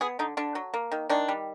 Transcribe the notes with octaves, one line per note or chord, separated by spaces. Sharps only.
B3 G#4
D3 D#4
D3 D4
F#3
A#3
D#3
D#3 D4
G3